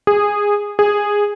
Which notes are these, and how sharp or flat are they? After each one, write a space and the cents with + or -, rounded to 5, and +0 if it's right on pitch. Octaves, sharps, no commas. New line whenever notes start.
G#4 -15
G#4 -10